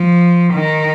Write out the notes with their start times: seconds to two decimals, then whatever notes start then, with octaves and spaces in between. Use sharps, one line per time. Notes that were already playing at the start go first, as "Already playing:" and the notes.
Already playing: F3
0.54 D#3